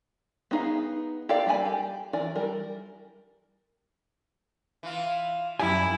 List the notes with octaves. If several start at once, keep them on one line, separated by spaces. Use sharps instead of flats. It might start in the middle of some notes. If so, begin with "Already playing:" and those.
B3 D4 D#4 G#4 F5
G4 A4 A#4 D5 F5
G3 A#3 E5 G#5 B5
G4
E3 A#4 D5 G#5
G3 A#4
E3 F4
F#2 E4 G4 G#5